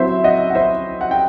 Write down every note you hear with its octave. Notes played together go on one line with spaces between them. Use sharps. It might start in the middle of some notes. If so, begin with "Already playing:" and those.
Already playing: F#3 C4 E4 C5 E5
D#5 F#5
F#5
C5 E5
F#5
G5